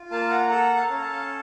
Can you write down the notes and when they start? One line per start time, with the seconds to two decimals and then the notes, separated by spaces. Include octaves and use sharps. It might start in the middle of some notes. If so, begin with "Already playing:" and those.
Already playing: F4
0.11 A#3 F5 A5
0.30 F#5 A#5
0.50 A4 F#5 A#5
0.76 F5 A5
0.89 C#4
0.98 A#5
1.02 F5 A5